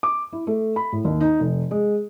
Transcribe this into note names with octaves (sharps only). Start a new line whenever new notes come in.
D6
E4
A3
B5
A2
D#2
D#4
F1
G#3